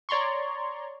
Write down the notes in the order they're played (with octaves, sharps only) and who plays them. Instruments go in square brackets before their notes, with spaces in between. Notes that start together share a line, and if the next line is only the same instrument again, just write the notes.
[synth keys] C#5 D5 A#5 C6 C#6